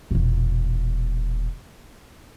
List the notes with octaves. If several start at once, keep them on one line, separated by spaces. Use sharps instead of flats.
E1 A#2